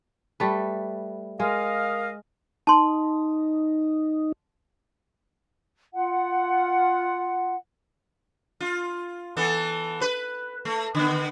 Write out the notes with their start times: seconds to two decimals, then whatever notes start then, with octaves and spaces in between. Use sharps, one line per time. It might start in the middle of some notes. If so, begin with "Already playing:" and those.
0.40 G3 A3 B4
1.40 G#3 A#4 D#5 F5
2.67 D#4 A5 C6
5.93 F4 F#5
8.61 F4
9.37 E3 B3 A4
10.01 B4
10.65 A3
10.95 D3 B3